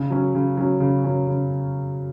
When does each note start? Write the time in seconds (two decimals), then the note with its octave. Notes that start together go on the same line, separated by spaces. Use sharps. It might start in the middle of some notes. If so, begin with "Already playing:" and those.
Already playing: C#3
0.10 F#3 C#4
0.35 C#3
0.57 F#3 C#4
0.80 C#3
1.04 F#3 C#4
1.27 C#3